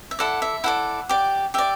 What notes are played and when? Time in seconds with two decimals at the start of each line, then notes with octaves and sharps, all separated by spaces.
0.11 E5
0.19 E4 A4 D5 F#5
0.42 E5
0.64 E4 A4 D5 F#5
1.09 G4 D5
1.54 G4 D5 E5